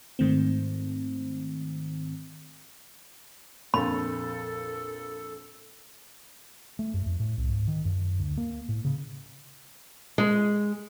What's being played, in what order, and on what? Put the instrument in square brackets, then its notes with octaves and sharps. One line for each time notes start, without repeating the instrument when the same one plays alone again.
[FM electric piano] G#2 D#3 A3 C4
[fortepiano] A#1 F2 [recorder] A4 [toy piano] B5
[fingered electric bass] A3
F#2
F2
A2
C2
G#2
D#3
F#2
D2
A#3
A2
C#3
[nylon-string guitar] G#3